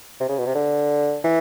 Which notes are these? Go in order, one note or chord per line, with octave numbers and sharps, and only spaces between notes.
C3
C#3
B2
C3
D3
E3